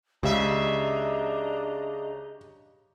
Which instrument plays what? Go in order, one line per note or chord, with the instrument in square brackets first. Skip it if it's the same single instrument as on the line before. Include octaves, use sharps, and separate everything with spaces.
[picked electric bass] C#2 [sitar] C#3 E5 [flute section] D4 D#5 A#5 [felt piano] G4